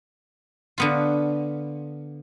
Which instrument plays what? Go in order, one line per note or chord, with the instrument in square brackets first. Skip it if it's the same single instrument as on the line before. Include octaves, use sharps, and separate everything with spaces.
[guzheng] D3 B3 F4